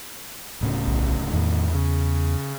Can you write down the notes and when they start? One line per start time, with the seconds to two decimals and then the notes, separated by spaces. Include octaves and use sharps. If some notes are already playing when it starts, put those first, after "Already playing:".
0.61 D1 A2 C#3
0.87 B1
1.33 E2 A2 D#3
1.74 C#3